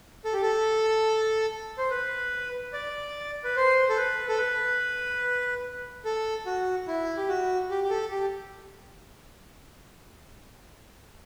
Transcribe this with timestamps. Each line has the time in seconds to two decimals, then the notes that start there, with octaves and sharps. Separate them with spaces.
0.25 A4
0.33 G4
0.42 A4
1.78 C5
1.90 B4
2.73 D5
3.44 B4
3.56 C5
3.89 A4
3.97 B4
4.28 A4
4.38 B4
6.05 A4
6.46 F#4
6.87 E4
7.17 G4
7.29 F#4
7.70 G4
7.84 G4
7.90 A4
8.11 G4